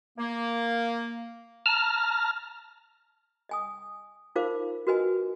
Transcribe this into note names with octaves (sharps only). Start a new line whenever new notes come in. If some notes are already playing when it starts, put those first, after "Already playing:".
A#3
A5 A#5 F6
D#5 G#5 D#6
D#4 F4 A#4 C5 F5 D6
F#4 A#4 B4 D#5 G#5